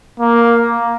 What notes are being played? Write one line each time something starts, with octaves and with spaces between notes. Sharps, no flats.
A#3